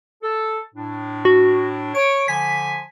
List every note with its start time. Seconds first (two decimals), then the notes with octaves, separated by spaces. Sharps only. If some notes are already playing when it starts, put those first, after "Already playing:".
0.23 A4
0.75 A2 D4
1.25 F#4
1.95 C#5 D7
2.28 D3 F3 G#5 B6